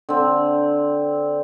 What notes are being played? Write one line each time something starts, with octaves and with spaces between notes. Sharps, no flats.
D3 C4